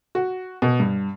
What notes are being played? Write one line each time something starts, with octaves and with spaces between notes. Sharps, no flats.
F#4
B2
G2